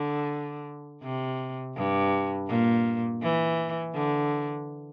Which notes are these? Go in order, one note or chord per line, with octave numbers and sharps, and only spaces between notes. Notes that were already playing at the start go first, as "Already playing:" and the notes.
Already playing: D3
C3
G2
A#2
E3
D3